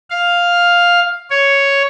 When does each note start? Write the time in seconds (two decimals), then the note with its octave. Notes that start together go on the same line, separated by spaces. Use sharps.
0.10 F5
1.30 C#5